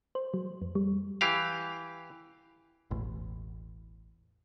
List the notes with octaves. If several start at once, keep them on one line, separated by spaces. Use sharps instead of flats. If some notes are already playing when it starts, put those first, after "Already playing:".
C5
F#3
F2
G3
E3 G4 F5
E1 A1